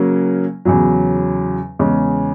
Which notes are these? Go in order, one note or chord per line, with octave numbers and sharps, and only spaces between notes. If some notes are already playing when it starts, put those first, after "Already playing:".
Already playing: C#3 F#3 A#3 C#4
E2 C#3 F#3
E2 C#3 G#3